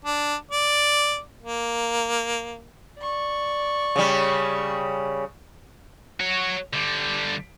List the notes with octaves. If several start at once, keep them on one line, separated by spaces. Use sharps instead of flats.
D4
D5
A#3
D5 C#6
C#3 G3
F#4 C#5
D3 G3